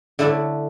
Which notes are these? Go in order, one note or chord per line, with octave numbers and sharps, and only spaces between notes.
D3 A3 E4 A4 D5